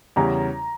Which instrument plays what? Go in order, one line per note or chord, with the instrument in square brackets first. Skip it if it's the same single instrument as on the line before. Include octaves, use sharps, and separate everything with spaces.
[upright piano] E2 C#3 G3 C#4 [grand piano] A#5